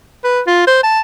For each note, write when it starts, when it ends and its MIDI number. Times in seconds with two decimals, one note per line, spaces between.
0.24 0.41 71
0.47 0.66 65
0.67 0.82 72
0.83 1.01 81